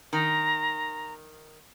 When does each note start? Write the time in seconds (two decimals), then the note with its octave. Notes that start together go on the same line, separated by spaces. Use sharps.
0.13 D#3 A#5